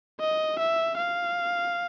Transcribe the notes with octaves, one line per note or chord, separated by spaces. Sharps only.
D#5
E5
F5